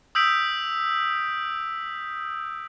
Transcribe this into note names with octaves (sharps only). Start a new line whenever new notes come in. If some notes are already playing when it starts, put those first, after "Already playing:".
D#6 E6 G6 B6 D7